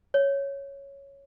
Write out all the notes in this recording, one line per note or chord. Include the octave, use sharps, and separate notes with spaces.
C#5